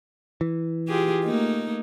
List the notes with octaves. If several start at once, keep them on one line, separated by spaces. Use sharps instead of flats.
E3
F4 G4 G#4
A3 A#3 D#4